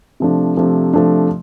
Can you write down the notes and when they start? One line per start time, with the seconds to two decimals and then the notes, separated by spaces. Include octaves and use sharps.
0.20 C3 F3 A3 D4
0.57 C3 F3 A3 D4
0.94 C3 F3 A3 D4